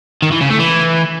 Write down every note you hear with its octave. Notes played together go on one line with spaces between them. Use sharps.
D#3
E3
C#3
A3
E3